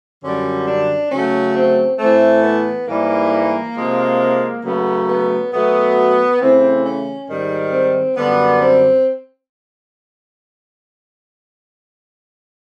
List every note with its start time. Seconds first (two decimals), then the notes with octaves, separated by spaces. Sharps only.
0.22 F#2 D3 G3 C#4
0.68 D4
1.11 C#3 F#3 A3 C#4
1.56 C4
1.99 A2 E3 A3 C4
2.43 B3
2.87 G#2 E3 G3 A#3
3.76 C3 F3 G#3
4.64 C#3 F#3 A3 B3
5.08 B3
5.52 B2 F#3 A3 B3
6.40 C#3 E3 A3 C4
6.85 C#4
7.29 G#2 D#3 G3
7.73 C4
8.17 F#2 D3 G3 B3
8.62 C4